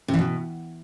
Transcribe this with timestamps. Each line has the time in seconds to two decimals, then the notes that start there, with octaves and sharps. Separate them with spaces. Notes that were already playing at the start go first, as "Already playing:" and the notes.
0.08 C3
0.14 E3
0.19 B2